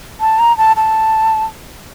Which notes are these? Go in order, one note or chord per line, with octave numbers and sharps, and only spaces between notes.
A5
A#5
A5
A5